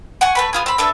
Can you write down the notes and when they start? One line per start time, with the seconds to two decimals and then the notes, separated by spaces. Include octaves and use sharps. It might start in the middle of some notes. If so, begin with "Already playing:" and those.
0.21 F#5 G#5 C#6
0.35 A3 B4 B5
0.53 B3 F4 G#4
0.66 C4 B5
0.78 D4 A4 B4 E5